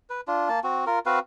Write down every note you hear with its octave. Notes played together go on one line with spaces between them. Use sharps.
B4
D4 F4
A#3 A5
C4 F#4
F4 A#4
C4 F#4 B4 F5